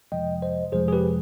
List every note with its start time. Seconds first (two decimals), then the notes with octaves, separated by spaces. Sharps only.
0.12 F2 C3 F3 G#3 D#5 G5
0.42 C5 D#5
0.72 F2 C3 F3 G#3 G#4 C5
0.88 G#4
0.93 G4 B4